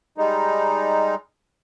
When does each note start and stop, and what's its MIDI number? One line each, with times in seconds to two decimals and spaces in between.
0.18 1.15 55
0.18 1.15 56
0.18 1.15 63